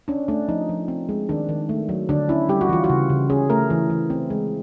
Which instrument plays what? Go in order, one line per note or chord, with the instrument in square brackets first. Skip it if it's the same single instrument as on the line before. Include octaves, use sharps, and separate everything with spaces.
[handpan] C#4 D4
A3 D4
F3 D#4
F3
C4
G#3
D#3 D4
D#3
A3
F#3
D3 D4
C#4 E4
G3 G4
F#4
E3 F4
F#4
C#3
C#3
C#4 G#4
A3 A#4
E3
E3
C4
G#3